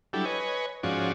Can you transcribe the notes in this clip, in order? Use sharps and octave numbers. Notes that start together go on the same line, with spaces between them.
F#3 G3 D4 E4 G4 A4
B4 C#5 D#5 G#5
G#2 F3 C#4 F#4 D5